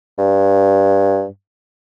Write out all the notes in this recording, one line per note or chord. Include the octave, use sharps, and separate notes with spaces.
G2